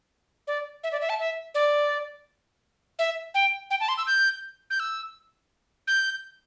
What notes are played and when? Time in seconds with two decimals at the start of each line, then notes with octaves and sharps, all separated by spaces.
0.47 D5
0.84 E5
0.92 D5
1.01 E5
1.09 A5
1.19 E5
1.55 D5
2.99 E5
3.35 G5
3.71 G5
3.80 A5
3.89 C6
3.98 E6
4.07 G6
4.70 G6
4.80 E6
5.88 G6